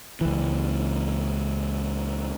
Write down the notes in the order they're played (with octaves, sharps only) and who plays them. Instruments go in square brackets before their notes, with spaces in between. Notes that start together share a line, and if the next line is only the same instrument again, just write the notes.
[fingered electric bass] C#2 E3